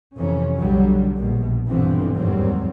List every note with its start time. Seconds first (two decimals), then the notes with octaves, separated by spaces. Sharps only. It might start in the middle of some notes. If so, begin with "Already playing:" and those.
0.16 F2 C3 E3 C#4
0.55 B1 D3 F#3 G3
1.15 A#1 B2
1.67 G2 B2 D3 E3 F3 C4
2.16 F1 D#2 G#2 F#3 G3 C4